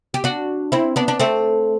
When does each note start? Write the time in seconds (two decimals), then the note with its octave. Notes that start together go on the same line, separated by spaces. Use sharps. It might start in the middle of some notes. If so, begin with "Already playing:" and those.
0.14 G4
0.24 D4 F#4
0.72 C4 E4
0.96 B3 D4
1.08 D4
1.20 A3 C4